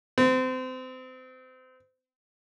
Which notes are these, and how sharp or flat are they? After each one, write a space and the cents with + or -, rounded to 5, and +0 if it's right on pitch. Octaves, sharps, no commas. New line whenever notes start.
C4 -30